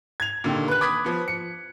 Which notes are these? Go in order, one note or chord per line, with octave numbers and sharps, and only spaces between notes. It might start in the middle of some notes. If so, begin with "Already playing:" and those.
G#6 F7
A#2 D3 D#3 G4
B4 F#6
B5 D6 D#6 G#6 B6
F3 B3
C#7